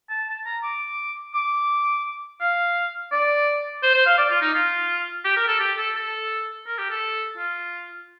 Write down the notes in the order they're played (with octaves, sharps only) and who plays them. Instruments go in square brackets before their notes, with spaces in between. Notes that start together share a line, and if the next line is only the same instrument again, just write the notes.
[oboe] A5
A5
A#5
D6
D6
F5
D5
C5
C5
F5
D5
F4
D#4
F4
G4
A#4
A4
G4
A4
A4
A#4
G4
A4
F4